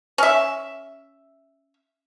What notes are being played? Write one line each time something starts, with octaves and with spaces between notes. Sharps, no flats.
C#4 E5